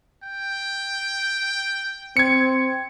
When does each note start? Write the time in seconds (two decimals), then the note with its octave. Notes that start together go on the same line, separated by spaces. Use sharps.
0.24 G5
2.17 C4 G#6 C#7